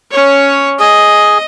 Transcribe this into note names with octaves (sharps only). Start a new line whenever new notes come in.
C#4 C#5
G#4 D#5